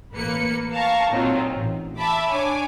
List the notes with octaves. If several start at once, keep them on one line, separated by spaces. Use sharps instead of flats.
A1 A#3 B4 C#7
F5 A5 A#5 C#6
A#2 D#3 F#3 C4 D#4 F4
A1
E5 A5 B5 D6
D4 C#5 G#5 D6